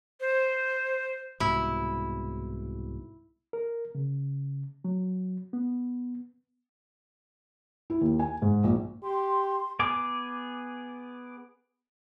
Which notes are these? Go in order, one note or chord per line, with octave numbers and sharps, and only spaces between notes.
C5
C2 G#2 B2 E4
A#4
C#3
F#3
B3
E4
D#2
G#5
G#2
A#1
G4 C6
B3 G#4 D6